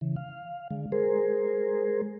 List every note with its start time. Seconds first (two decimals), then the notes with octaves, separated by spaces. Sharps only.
0.01 C#3 E3
0.16 F5
0.71 D3 G#3
0.92 G#3 G#4 A#4 C5